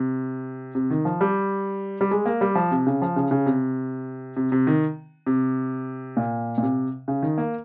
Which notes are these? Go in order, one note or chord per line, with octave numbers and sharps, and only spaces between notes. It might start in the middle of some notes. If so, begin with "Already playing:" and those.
Already playing: C3
C3
D#3
F3
G3
G3
G#3
A#3
G3
F3
C3
C#3
F3
C#3
C#3
C3
C3
C3
D#3
C3
A#2
A#2
C3
C#3
D#3
A#3